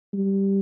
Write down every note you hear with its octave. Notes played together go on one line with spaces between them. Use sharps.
G3